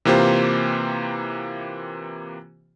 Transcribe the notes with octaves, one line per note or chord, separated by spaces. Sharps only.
C3 E3 A#3 F4 G4 C5